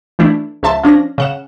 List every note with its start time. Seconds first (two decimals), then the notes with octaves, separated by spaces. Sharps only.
0.19 E3 A3 D4 E4
0.63 C#2 F3 E5 A5 C6
0.83 F3 C#4 D4 A#6
1.18 C#3 F#5 E7